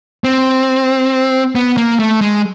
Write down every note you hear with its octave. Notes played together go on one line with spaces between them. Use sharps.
C4
B3
A#3
A3
G#3